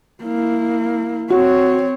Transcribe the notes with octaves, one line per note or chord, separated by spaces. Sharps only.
A#3 E4
C4 F#4 C#5